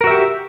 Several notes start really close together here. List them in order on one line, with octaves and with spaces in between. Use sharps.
A#4 F#4 E5 G4